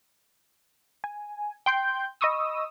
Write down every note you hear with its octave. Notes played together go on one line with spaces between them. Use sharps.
G#5
G5 C6 G6
D#5 B5 C#6 D#6 E6